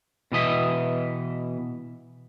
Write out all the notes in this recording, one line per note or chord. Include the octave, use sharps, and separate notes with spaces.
B2 E3 D#5 E5